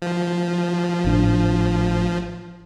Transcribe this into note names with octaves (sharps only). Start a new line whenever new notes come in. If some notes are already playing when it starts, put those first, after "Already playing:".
F3
G#1 A2 D4